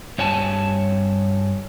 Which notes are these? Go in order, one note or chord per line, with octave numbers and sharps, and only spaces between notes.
G2 C#5 G#5 A5